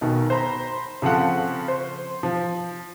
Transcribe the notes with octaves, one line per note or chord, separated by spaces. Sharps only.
B1 B2 D#3
C5 A#5 B5
C#3 F3 C4 A4 F#5
C5
F3